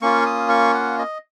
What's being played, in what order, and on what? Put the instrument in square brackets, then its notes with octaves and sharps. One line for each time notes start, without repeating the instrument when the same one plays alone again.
[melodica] A#3 C#4 F4 C#6
D#6
C#6
F#5
D#5